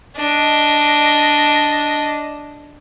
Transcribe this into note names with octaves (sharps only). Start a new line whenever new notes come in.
D4 D#5